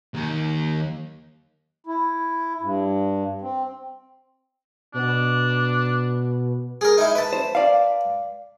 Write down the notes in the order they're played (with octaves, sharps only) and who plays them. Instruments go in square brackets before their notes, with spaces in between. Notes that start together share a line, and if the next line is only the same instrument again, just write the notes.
[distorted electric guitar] D#2 D#3
[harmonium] E4
G2
C4
[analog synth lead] B2 [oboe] D4
[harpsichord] G#4 A#4
D#4 E4
B4 A5
[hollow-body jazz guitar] C5
D5 F5